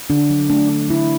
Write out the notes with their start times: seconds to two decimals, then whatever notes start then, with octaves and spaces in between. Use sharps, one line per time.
0.10 D3 D4
0.30 F#3
0.50 A3 D4
0.69 D4
0.89 D3 E4